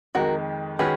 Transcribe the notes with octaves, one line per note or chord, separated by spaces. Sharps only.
F2 D#3 G#3 F#4 A#4
D#3 G#3 C#4 F#4 G#4 B4